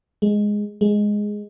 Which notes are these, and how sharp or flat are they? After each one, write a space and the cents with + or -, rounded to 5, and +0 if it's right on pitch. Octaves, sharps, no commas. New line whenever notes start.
G#3 +0
G#3 +0